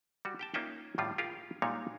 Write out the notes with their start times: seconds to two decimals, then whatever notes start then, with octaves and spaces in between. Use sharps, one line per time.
0.25 G3 F#4
0.39 G4 G5 A5
0.54 A#3 C#4 D#4 F4 E5 G5
0.98 A2 D#3 G3 F4
1.18 F4 G4 G#4 A#4
1.62 A#2 G3 G#3 D#4 C#5